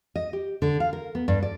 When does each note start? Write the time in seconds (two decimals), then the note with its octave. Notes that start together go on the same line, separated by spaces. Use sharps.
0.16 D#5
0.33 G4
0.62 D3
0.80 F5
0.93 A#4
1.15 B3
1.28 G2
1.43 D5